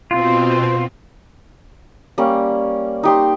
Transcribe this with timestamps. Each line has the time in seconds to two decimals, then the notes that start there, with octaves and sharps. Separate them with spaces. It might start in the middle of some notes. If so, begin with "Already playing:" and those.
0.11 B2 C4 F4
2.18 G3 A#3 C#4
3.03 D#4 G4 C6